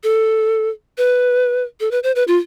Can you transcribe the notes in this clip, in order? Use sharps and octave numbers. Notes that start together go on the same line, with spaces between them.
A4
B4
A4
B4
C5
B4
F4